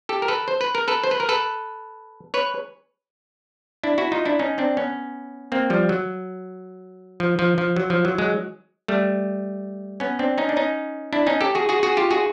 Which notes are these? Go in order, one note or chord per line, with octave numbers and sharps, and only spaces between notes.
G4 A4
A#4
A4 B4
C5
B4
A#4
A4 B4
C5
B4
A#4
A4 B4
B4 C#5
D4 E4
E4 F#4
D#4 F4
D4 E4
C#4 D#4
C4 D4
B3 C#4
A#3 C4
F3 G3
F#3
F3
F3
F3
F#3
F3
F#3
F#3 G#3
G3 A3
B3 C#4
C4 D4
C#4 D#4
D4
C#4 D#4
D4 E4
C#4 D#4
G4 A4
F#4 G#4
F#4 G#4
F#4 G#4
F4 G4
F#4 G#4